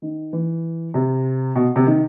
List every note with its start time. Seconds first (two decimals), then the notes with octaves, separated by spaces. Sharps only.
0.02 D#3
0.33 E3
0.94 C3
1.55 B2
1.76 C3
1.86 D#3